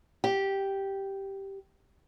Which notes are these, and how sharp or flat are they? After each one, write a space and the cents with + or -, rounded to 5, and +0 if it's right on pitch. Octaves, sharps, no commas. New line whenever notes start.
G4 -5